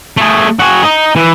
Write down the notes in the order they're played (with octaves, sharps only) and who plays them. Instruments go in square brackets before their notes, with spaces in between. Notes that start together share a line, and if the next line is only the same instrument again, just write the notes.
[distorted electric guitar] A3 G#4
F#4 G#4
D#4
E3